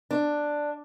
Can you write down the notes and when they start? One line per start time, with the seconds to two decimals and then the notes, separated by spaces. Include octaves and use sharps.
0.11 D4